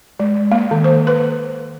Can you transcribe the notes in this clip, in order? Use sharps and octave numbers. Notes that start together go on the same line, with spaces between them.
G#3
A#3
D#3
C5
B4